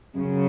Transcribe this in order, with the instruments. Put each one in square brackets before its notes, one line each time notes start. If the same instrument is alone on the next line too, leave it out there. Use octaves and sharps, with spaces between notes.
[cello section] F#2 C#3